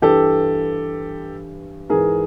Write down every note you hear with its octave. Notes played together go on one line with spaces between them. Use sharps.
G2 E3 G4 A4
G#2 E3 G#4 A#4